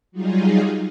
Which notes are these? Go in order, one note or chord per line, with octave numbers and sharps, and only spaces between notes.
F#3 G3 D#4 F4 G#4